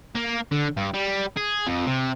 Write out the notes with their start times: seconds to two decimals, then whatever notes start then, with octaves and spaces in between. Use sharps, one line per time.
0.15 A#3
0.52 D3
0.77 G2
0.94 G3
1.37 G#4
1.66 F2
1.86 C3